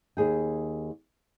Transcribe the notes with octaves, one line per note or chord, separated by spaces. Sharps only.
D#2 G#4 G5